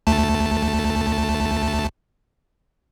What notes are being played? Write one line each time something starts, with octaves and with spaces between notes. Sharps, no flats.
D2 A3 A5